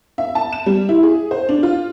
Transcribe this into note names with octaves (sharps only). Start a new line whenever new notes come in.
E5
A5
E7
G3
E4
G#4
C5
D4
F4